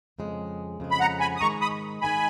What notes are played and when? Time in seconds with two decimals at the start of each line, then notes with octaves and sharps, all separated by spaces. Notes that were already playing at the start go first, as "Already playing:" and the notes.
0.19 F2 C#3 G#3
0.80 F2 C#3 G#3
0.91 B5
1.00 F#5 A#5
1.20 G#5 B5
1.37 D#6
1.41 G#2 D#3 G#3 D#4 A#5 C#6
1.61 B5 D#6
2.01 G#2 D#3 G#3 D#4 G#5 B5